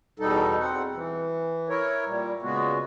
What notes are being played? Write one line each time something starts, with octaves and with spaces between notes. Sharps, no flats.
E2 B2 G3 D#4 A4
C4 F#5
E3
E4 A#4 C#5
A#2 G3
A#2 C#3 G#3 B3 F#4